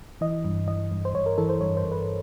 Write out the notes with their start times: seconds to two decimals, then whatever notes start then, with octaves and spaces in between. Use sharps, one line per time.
0.21 E3 D#5
0.45 G2
0.67 E3 D#5
0.92 G2
1.05 C5
1.14 G2 C#5
1.26 A#4
1.38 E3 A4
1.49 C5
1.61 G2 C#5
1.77 C5
1.84 G2
1.92 B4